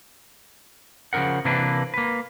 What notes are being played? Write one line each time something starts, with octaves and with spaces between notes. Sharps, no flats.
C#3 F3 E4 A#4 F#5
C3 E3 A#3 D4 B4
A#3 B4